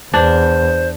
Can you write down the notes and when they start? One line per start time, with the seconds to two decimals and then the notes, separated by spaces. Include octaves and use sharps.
0.14 E2 D4 C5